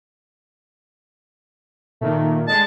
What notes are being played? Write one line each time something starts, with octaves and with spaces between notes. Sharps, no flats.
A#2 D#3 A3
D3 G#3 A5